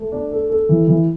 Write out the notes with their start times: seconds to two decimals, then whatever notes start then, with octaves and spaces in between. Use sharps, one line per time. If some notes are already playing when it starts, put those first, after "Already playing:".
Already playing: A3
0.12 D4
0.31 A4
0.50 A4
0.69 E3
0.87 E3